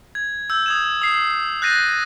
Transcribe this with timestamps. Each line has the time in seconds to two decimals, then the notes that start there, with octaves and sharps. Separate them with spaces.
0.15 G#6
0.50 E6 G6
0.66 D#6 G#6 E7
1.02 D#6 C7 E7
1.62 F#6 G6 A6 A#6 C7 D#7